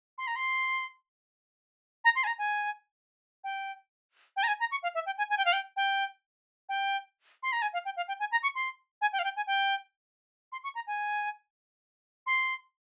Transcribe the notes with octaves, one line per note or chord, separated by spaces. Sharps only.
C6
A#5
C6
A#5
C6
G#5
A#5
G#5
G5
G5
A#5
G#5
A#5
C#6
F5
E5
G5
G#5
G#5
G5
F5
G5
G5
G5
C6
A#5
G#5
F5
G5
F5
G5
G#5
A#5
C#6
C6
G#5
G5
F5
G5
G#5
G5
C6
C#6
A#5
G#5
C6